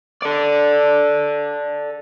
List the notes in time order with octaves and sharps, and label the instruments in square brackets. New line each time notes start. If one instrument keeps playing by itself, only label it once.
[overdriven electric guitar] A4 D5